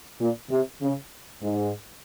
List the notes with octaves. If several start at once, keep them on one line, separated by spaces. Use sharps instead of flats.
A#2
C3
C#3
G#2